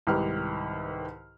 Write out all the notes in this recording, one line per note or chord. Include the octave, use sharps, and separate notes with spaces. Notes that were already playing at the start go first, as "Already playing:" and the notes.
C2 G#2 D#3 G4 B4 F6